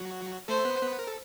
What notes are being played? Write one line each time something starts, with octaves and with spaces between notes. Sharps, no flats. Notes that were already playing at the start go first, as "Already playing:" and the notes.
Already playing: F#3 F#4
A3 A4 C5
B3 B4
B3 B4
A#4
A4